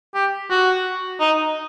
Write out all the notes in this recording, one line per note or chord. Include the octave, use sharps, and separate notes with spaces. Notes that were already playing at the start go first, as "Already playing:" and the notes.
G4
F#4
D#4